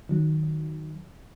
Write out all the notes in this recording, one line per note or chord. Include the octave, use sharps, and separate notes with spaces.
D#3 F#3